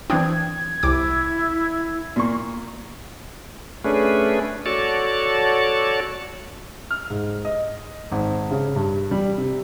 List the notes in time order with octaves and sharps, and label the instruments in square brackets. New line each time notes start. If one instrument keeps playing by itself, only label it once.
[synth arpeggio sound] E3 C4 D4 [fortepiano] G5 D#6 [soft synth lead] G#6
[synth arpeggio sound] C2 D6 [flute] E4
[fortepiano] A#2 A#3 C#6
[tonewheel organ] A3 C#4 D4 G#4 B4
F#4 A4 C#5 D5 A5
[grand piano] F6
G#2
D#5
G#1
C#3
G2
G3
C3